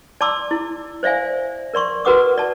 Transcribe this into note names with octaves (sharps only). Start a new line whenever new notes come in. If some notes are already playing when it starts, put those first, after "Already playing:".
D5 A5 A#5 C6 D6 E6
E4
C5 D5 E5 F5 G#5
A#4 D5 C6 C#6
F#4 A#4 B4 F#5 D6 D#6
D5 A5